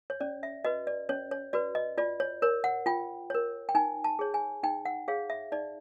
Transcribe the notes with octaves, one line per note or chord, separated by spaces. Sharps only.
C#5
C#4 D5
E5
F#4 B4 D#5
D5
C#4 C#5
C#5
F#4 B4 D5
D#5
F4 D5
C#5
A#4 C#5
F#5
F4 G5
A#4 C#5
G5
D#4 G#5
A5
G#4 C#5
G#5
D#4 G5
F#5
G#4 C#5 F5
E5
D#4 D5